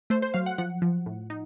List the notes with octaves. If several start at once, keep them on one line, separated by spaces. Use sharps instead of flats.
A3 C5
C5
F#3 F5
F#5
F3 F#5
F3
A2
D#4